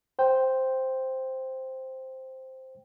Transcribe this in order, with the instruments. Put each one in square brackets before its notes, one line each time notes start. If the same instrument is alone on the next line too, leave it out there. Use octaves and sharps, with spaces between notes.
[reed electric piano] C5 G5